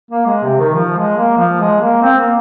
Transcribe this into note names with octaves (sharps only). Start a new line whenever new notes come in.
A#3
G#3
C3
D#3
F3
G#3
A#3
F3
G#3
A#3
C4
A#3